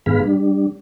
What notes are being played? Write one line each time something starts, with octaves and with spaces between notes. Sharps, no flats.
G#2 D#3 B3 G#4 F5 B5
G3 D4